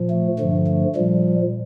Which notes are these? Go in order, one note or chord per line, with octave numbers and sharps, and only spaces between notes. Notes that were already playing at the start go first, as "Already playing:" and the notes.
Already playing: A#2 F3
A3
G2 D3 F3
A3
A#2 F3 G3